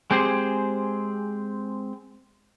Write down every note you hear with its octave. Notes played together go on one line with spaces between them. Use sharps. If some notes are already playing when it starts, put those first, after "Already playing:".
G#3 C4 G4 G#4 C5